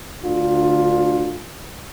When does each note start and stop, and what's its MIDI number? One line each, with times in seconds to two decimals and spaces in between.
0.23 1.40 38
0.23 1.40 50
0.23 1.40 65